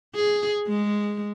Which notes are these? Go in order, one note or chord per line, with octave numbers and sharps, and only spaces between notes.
G#4
G#3